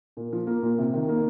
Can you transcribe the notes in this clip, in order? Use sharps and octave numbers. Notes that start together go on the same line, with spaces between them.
A#2
F3
A#3
A#2
C3
D#3
A#3